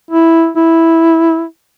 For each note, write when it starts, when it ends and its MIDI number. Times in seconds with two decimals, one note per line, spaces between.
0.11 0.49 64
0.56 1.44 64